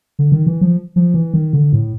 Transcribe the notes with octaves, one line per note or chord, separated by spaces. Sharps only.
D3
D#3
E3
F3
F3
E3
D#3
D3
A2